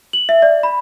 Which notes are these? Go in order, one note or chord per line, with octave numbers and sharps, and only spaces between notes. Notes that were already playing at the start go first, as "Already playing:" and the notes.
F#7
E5
D5
B5